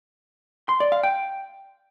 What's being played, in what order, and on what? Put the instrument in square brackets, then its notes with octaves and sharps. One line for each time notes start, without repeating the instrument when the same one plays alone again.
[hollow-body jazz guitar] C6
D5
F5
G5